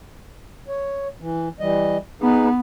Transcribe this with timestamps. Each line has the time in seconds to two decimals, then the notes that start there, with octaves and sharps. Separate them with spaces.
0.68 C#5
1.20 E3
1.60 E3 G3 D#5
2.22 B3 D#4 G#4 B4